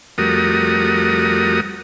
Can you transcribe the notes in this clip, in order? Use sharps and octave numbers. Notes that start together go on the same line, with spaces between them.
F2 G3 A3 F#4 A#4 D#6